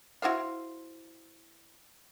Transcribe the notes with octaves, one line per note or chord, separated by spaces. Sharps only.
E4 F#4 C5 F5